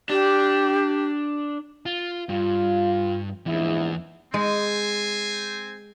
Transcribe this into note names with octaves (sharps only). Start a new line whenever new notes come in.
D4 G4
F4
G2 F4
A#1 E2 G#2 E4
G#3 C4 C5 G#5